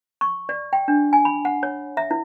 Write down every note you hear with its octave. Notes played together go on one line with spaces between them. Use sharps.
C#6
D5
G5
D4
G#5
B5
F#5
C#5
E5
E4